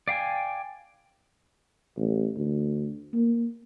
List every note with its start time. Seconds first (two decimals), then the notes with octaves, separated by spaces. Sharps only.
0.08 D5 F5 G5 G#5
1.96 A1
2.37 D2
3.14 A#3